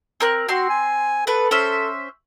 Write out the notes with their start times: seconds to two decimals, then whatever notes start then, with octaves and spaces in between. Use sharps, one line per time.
0.20 C4 A#4 F#6
0.48 C4 F#4 C6
0.69 G#5
1.27 B3 A4 B4
1.51 C#4 C5 E5